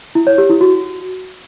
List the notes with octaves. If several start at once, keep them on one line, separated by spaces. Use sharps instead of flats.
E4
C#5
G4
E4
F#4